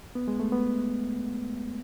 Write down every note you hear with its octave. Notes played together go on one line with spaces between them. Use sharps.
B3
G#3
A3
B3